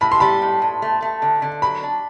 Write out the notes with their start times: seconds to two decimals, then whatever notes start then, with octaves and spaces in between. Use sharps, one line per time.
0.01 A2 B5
0.12 C6
0.20 G3 B5
0.42 A2
0.62 A2
0.82 A3
1.02 A3
1.22 D3
1.42 D3
1.62 F#3 B5
1.83 D4